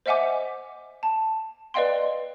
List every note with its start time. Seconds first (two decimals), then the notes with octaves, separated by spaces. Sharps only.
0.06 C5 D#5 E5 F#5 G#5 D6
1.03 A5
1.74 B4 D5 D#5 F5 G5 C6